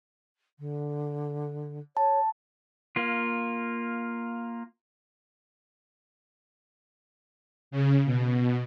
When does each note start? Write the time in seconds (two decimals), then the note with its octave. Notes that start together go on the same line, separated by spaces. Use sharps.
0.59 D3
1.97 C#5 A5
2.96 A#3 F4
7.71 C#3
8.05 B2